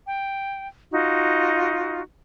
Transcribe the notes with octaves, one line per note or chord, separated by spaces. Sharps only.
G5
D#4 F4 F#4